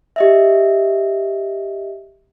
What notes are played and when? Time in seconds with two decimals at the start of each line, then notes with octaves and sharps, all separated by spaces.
0.16 G4 D#5 E5